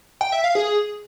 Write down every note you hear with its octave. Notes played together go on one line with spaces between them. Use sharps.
G5
E5
F5
G#4